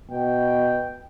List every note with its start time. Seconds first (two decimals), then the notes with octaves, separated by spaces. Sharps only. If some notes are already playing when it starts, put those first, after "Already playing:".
0.11 B2 G5